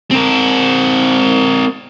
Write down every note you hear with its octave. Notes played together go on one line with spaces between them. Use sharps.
C4 A#4